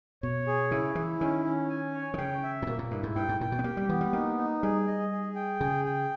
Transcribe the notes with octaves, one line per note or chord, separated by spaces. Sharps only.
B2 C#5
G#4
C#3 E4
E3 E4
D#3 C#4
C#4
G#5
C#5
D#3
C#3 G5
E5
A#2
B2 A#3
A#2
G2 E4
G#2
G2 G5
G#2
A#2 G5
B2
B3
A#3 G4
G3
E3 B3
G3
A#3 D#4
D#4
G3 G#4
D#5
G#4
G5
C#3 G#4
G5